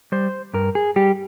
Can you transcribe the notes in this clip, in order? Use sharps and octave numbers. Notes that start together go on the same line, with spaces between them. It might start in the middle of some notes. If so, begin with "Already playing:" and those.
G3 C5
G2 A#4
G#4
G3 G4